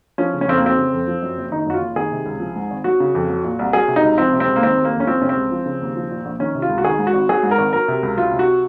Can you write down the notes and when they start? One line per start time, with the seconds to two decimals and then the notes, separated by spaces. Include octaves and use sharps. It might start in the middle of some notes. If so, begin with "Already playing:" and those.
0.18 F3 C#4
0.34 C#3
0.41 C#4
0.48 F2 C4
0.57 A#3
0.62 F#3 C4
0.78 C#3
0.93 F2
1.07 F3
1.22 F#2
1.37 F#1
1.52 D#3 D#4
1.66 F#2 F#4
1.74 F4
1.81 F#1
1.96 D#3 G#4
2.11 C3
2.26 C#2
2.40 F3
2.56 G#2
2.71 G#1
2.84 F#3 F#4
3.00 C#3
3.15 F2
3.30 F#3
3.44 A#2
3.59 C2
3.73 F#3 G#4
3.88 C3
3.96 D#4
4.03 C#2
4.18 F3 C4
4.33 C3
4.40 C4
4.47 C#2
4.56 A#3
4.63 D#3 C4
4.78 D#2
4.85 A#3
4.92 F1
5.00 C#4
5.07 F3 C4
5.22 C3 C#4
5.29 C4
5.37 C#2
5.51 F3
5.66 C#3
5.81 D#2
5.96 F3
6.11 A#2
6.25 A#1
6.39 D#3 C#4
6.55 C3
6.62 F4
6.69 C#2
6.78 F#4
6.84 D#3 G#4
6.99 G#2
7.07 F#4
7.13 G#1
7.29 F#3 G#4
7.43 G#2
7.51 A#4
7.58 G#1
7.73 F#3 A#4
7.88 C3
8.03 C#2
8.17 F#3 F4
8.32 C3
8.39 F#4